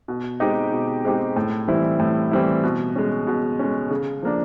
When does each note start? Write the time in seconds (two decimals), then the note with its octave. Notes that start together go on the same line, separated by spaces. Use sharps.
0.08 B2
0.40 G#3 C4 D#4 G4
0.72 B2
1.05 G#3 C4 D#4 G4
1.36 A2
1.68 E3 G3 C4 E4
1.99 A2
2.31 E3 G3 C4 E4
2.63 B2
2.95 G#3 C#4
3.27 B2
3.59 G#3 C#4
3.91 C#3
4.22 F3 A#3 D4